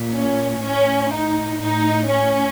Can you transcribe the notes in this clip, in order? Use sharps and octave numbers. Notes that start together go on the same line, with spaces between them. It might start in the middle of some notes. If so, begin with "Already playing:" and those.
Already playing: A#2
C#4
A2 C#4
D#4
A2 D#4
C#4